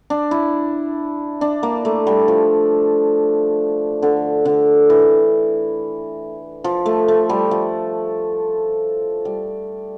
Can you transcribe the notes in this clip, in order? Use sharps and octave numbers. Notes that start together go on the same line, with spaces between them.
D4
E4
D4
A#3
A3
G3
F3
D3
D3
E3
F3
A3
A3
G3
F3
G3